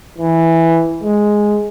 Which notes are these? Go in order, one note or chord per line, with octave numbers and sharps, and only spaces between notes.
E3
G#3